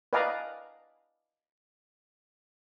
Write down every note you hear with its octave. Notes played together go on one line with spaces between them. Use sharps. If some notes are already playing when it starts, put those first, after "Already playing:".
B4 D5 D#5 F5 G#5 A#5